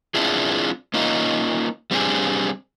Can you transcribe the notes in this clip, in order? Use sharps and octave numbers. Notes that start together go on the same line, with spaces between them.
C4 D4 E4 F4 G#4
A#3 C#4 D#4 F4
G3 C4 D4 G#4